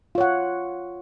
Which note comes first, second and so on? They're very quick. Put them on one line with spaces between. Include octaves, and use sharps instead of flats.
F4 C#5 F#5